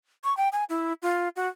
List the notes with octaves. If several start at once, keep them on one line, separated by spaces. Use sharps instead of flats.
C#6
G5
G#5
E4
F4
F#4